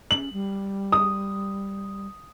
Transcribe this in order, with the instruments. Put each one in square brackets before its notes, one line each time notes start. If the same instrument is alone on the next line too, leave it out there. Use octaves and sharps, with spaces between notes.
[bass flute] C#4 [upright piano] F#7
[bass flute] G3
[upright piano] D#6